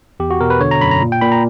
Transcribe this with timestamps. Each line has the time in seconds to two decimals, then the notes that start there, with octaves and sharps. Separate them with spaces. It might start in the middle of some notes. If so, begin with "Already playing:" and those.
0.20 E2 G4
0.31 F#4
0.41 B2 A#4
0.50 B4
0.60 D3 C#5
0.71 A#5
0.81 F#2 B5
0.91 A#5
1.02 A#2
1.12 G5
1.21 A#2 B5
1.32 A#5